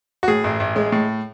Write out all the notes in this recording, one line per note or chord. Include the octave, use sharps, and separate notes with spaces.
F#4
A2 G#4
A1
A1
G#3
A2